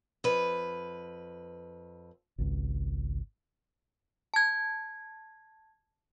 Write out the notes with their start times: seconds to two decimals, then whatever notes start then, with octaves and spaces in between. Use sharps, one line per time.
0.24 F2 B4
2.38 G#1 C#2
4.34 A5 G#6